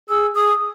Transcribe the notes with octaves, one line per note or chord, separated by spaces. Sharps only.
G#4 E6
G#4 D#6